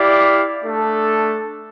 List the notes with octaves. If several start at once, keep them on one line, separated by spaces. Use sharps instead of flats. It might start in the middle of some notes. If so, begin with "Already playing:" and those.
Already playing: E4 G4 D5 F5
A3 D4 A4